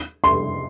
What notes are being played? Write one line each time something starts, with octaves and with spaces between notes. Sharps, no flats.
C6